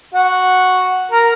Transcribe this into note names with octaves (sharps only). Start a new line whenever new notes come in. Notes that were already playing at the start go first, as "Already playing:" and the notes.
F#4
A#4